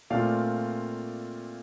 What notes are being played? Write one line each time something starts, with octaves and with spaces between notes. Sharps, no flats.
A#2 A3 C4 F4 D5 F5